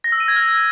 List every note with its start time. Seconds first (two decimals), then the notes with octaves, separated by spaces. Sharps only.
0.04 A#6
0.12 E6
0.20 D#7
0.28 G#6
0.36 F6